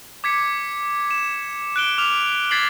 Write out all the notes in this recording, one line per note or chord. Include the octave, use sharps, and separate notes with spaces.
D6 G#6 B6 C#7
E7
F#6 D7 G7
D6 F6 F7
G#6 A6 B6 C7 F#7